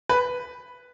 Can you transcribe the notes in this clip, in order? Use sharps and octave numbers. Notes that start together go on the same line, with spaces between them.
B4